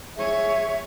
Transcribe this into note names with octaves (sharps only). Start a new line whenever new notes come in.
G#4 C#5 E5